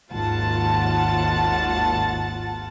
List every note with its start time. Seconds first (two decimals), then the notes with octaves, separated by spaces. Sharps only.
0.11 G#1 D#2 F4 F#5 A5 A6